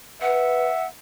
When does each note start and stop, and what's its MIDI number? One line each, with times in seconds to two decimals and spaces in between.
0.22 0.69 71
0.22 0.88 76
0.22 0.87 78